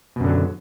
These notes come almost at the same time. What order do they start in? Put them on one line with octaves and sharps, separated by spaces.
B2 F#2 D3 F#3